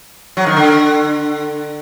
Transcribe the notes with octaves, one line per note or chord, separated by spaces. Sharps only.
F#3
D#3
D3